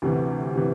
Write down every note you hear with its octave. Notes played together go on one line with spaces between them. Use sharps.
D2 C3 E3
C3 E3